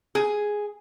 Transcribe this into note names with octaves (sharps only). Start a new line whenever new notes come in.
G#4